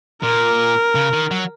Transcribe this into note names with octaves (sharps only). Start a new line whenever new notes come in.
A#2 A#4
C#3
D#3
F#3